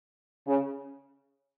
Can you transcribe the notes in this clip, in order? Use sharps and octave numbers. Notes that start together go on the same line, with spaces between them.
C#3